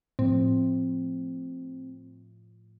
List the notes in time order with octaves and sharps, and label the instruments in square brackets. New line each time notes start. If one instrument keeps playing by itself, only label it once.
[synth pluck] A2 F3 [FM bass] C4